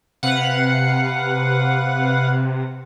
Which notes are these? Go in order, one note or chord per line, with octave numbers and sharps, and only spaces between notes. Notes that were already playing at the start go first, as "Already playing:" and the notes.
C3 B4 F5 F#5